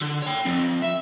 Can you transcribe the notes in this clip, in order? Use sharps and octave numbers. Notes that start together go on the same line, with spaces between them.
D3
C#5 G5
F3 C4
E5